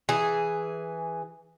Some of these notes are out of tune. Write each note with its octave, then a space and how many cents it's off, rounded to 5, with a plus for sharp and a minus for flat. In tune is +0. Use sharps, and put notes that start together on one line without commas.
E3 +0 G#4 +0